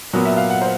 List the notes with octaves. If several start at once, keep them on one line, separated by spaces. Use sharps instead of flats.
A#2 F#3 B3
E5
F5
F#5
C5